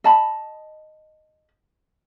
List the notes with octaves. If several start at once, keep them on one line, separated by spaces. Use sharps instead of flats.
D#5 A5 B5